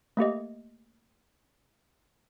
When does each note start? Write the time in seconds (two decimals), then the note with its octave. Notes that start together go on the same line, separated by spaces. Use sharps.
0.17 A3 A#3 G4 D#5